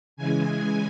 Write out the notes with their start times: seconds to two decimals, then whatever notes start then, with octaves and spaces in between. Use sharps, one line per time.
0.17 C#3 E3 G#3 G#5
0.59 G#5